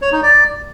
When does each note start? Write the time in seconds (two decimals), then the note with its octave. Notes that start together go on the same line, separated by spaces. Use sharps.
0.02 C#5
0.12 D#4
0.23 D5